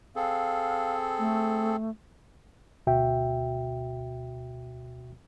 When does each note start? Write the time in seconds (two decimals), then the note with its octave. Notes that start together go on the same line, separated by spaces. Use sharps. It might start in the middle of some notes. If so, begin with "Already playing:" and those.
0.16 C4 G#4 A4 F5
1.19 A3
2.87 D2 B2 F#4 E5 G5